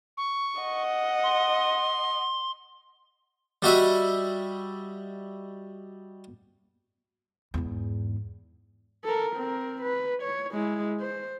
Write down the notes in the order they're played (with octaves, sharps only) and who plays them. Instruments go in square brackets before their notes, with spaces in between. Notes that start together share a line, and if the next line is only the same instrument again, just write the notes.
[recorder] C#6
[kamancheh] D#5 F#5
[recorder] C6
[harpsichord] G3 F#4 D#5 E5
[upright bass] E2 G#2
[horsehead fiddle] A4 A#4
C4 A#4
B4
C#5
G#3 E4
C5